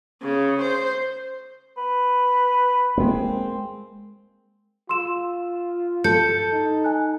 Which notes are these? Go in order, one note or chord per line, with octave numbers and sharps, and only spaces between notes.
C#3
C5
B4
G#3 A#3 C4
F4 C6 E6 E7
A4 G6 C#7
D#4
G#5 F#6